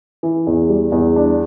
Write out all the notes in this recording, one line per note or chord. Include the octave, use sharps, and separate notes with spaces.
E3
E2
G3
E2
D4